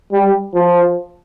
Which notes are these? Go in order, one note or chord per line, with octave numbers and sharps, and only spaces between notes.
G3
F3